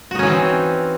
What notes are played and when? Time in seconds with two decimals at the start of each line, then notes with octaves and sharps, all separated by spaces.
0.11 F#4
0.15 D#4
0.19 C#4
0.23 E3
0.27 C4